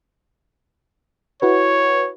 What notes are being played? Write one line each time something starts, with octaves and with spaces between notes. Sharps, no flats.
E4 F#4 B4 C#5